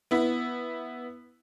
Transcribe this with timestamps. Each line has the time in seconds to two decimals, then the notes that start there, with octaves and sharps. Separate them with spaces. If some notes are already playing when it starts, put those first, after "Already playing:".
0.11 B3 E4